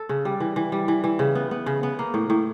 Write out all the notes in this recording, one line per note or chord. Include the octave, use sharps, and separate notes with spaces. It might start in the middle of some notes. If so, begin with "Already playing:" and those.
Already playing: A4
C#3
G3
E3
E3
G3
E3
E3
C#3
B3
B3
C#3
B3
A#3
A2
A2